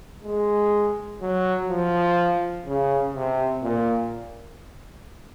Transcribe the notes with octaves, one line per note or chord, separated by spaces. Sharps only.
G#3
F#3
F3
C#3
C3
A#2